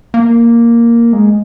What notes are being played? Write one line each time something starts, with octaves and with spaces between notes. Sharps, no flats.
A#3
G#3